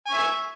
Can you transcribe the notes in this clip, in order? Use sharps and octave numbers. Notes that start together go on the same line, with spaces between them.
E5 G#5 C#6